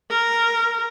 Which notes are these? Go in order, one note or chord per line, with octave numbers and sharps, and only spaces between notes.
A#4